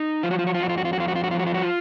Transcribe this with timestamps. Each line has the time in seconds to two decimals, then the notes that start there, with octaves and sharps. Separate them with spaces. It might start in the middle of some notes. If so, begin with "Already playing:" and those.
Already playing: D#4
0.23 F3 F4
0.31 F#4
0.39 F4
0.47 F#4
0.54 F4
0.60 F2 F#4
0.69 F4
0.78 F#4
0.85 F4
0.93 F#4
0.98 F2 F4
1.08 F#4
1.16 F4
1.24 F#4
1.31 F4
1.35 F3 F#4
1.47 F4
1.54 F#4
1.62 F4